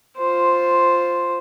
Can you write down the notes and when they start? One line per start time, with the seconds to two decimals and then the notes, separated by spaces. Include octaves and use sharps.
0.17 F4 C5